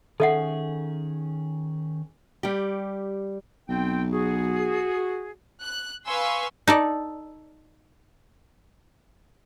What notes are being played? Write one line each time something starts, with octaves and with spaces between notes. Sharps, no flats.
D#3 C#4 G#4 A4 E5 F#5
G3 G4
B1 C4 G5
F#4 G#4
F#6
B4 F5 G#5 C6 C#6 E6
D#4 A4 D5